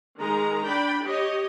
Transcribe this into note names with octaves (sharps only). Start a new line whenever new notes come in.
D#3 G#3 A#5
D4 G5 B5
G4 C#5 D#5